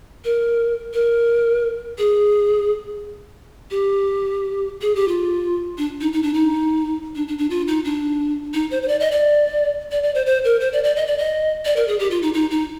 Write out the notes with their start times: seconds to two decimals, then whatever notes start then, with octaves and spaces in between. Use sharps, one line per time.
0.25 A#4
0.94 A#4
1.98 G#4
3.71 G4
4.82 G#4
4.95 G4
5.08 F4
5.78 D4
6.01 D#4
6.13 D#4
6.23 D4
6.34 D#4
7.16 D4
7.28 D4
7.38 D4
7.50 F4
7.68 D#4
7.85 D4
8.54 D#4
8.71 C5
8.83 C5
8.88 D5
9.00 D#5
9.12 D5
9.92 D5
10.03 D5
10.15 C5
10.26 C5
10.45 A#4
10.61 C5
10.73 D5
10.84 D5
10.96 D#5
11.07 D5
11.18 D#5
11.65 D5
11.76 A#4
11.88 G#4
11.99 G4
12.11 F4
12.22 D#4
12.34 D#4
12.51 D#4